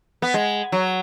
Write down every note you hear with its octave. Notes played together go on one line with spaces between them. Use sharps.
B3
G#3
F#3